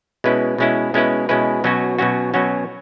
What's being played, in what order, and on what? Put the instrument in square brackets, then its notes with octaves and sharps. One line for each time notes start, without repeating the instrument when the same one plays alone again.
[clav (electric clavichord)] B2 G#3 C#4 E4 B4
B2 G#3 C#4 E4 B4
B2 G#3 C#4 E4 B4
B2 G#3 C#4 E4 B4
B2 F#3 C#4 F#4
B2 F#3 C#4 F#4
B2 F#3 C#4 F#4